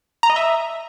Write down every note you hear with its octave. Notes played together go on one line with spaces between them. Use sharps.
A#5
D#5
E5